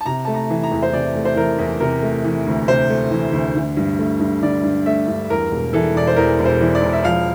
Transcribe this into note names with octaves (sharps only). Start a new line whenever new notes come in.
A5
C3 A#5
A3 A5
A#5
E3
A#5
E2
C5
C3 D5
A3
C5
E3 A#4
E2
C3 A#4
A3
E3
D2
C3 C5
A3
E3
D2
D3
G2
A3
G2
D3 D5
G2
A3 E5
G2
E2 A#4
E1
E3 A4
E1 D5
C5
E2 A#4
E1
C5
E3
D5
E1
E5
F3 F5